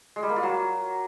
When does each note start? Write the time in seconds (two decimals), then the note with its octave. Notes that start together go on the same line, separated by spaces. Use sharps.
0.16 G#3
0.23 G3
0.30 A#3
0.36 F4
0.43 F#3